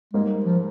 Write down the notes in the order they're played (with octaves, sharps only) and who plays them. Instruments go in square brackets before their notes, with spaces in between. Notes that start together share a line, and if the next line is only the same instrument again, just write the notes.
[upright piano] G#2 G3 A#3 [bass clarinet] G#3
[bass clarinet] F3